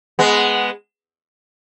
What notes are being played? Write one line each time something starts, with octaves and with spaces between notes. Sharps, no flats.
G#3 B3